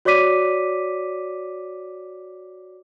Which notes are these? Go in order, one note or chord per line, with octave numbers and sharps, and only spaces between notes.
F#4 C#5 D5 D6 B6 D#7